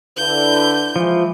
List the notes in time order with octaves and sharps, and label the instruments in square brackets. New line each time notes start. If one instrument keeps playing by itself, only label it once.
[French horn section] D3 E4 B4 [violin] G6
[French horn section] E3 G#3 [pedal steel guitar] F3